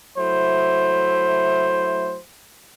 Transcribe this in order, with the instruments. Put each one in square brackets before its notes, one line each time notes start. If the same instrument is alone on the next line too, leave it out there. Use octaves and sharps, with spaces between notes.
[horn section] F#3 A3 E4 C5